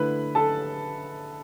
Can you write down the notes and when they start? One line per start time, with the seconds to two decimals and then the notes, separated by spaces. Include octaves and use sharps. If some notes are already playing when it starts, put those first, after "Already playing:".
Already playing: D3 A3 E4 B4 B5
0.35 A4 A5